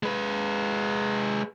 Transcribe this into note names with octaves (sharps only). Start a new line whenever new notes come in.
G#3 B4